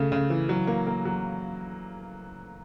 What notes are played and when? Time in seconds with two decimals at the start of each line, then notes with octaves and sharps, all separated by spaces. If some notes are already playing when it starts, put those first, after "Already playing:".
Already playing: C#3 A3
0.12 C#3
0.30 E3
0.49 F#3
0.67 A#3
0.87 A#3
1.05 F#3